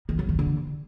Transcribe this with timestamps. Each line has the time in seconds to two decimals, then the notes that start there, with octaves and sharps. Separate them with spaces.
0.09 D#3
0.19 F#3
0.29 D#3
0.39 D3